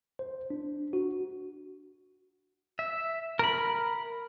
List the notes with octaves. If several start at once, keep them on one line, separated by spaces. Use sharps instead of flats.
C5
D4
F#4
E5
A#4 B5